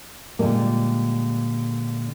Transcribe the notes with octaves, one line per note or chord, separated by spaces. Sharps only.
A#2 D3 F3 G3 G#3 A#3